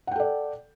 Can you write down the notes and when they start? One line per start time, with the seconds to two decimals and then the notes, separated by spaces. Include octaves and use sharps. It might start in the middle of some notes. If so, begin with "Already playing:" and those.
0.07 F#5
0.11 G5
0.16 A4
0.20 D5